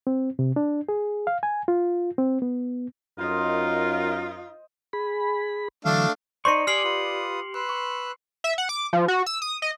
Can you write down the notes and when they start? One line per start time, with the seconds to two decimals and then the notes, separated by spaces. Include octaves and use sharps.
0.07 C4
0.39 C3
0.56 D4
0.89 G#4
1.27 F5
1.43 G#5
1.68 F4
2.18 C4
2.42 B3
3.19 F#2 D#4 F4 A#4 C5 D#5
4.93 G#4 B5
5.85 D3 E3 F#3 A3 D4 F5
6.45 D#4 C5 D5 C6 C#6 C#7
6.67 G4 G#5 D6 D#6 F6 C7 F#7
6.84 F4 B4 D#6
7.54 B4 C6 E6 F#6
7.69 C#6
8.44 E5
8.58 F#5
8.69 D6
8.93 F3
9.08 F#4
9.26 E6
9.42 D#6
9.62 D#5